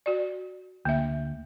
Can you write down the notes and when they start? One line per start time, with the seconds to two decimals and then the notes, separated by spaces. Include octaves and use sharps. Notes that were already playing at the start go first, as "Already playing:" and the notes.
0.06 F#4 D5
0.85 D2 A#3 E5